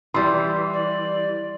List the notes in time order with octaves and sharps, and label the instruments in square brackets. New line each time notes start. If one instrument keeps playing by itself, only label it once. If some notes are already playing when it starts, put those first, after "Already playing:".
[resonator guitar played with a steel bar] E3 G3 [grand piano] C6
[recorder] D5